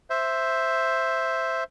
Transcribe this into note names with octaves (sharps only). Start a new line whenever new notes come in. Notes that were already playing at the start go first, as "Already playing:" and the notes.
C5 E5